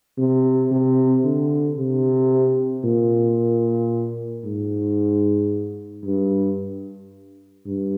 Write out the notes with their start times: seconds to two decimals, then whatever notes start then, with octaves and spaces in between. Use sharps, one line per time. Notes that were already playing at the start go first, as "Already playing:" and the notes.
0.18 C3
0.72 C3
1.25 D3
1.78 C3
2.84 A#2
4.45 G#2
6.05 G2
7.66 G2